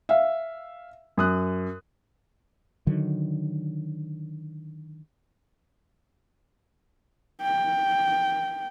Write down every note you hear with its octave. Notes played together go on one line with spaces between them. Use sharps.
E5 F5
F#2 D#6 F#6
D3 D#3 F#3
G5